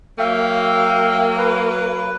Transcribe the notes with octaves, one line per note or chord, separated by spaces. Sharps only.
F#3 A#3 E5 F5 G5
B4